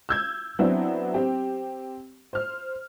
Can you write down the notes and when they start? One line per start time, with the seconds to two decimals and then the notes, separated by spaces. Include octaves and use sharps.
0.09 E6 G6 G#6
0.59 F#3 B3 C4 D4 E4
1.14 C4 G4
2.33 C5 F6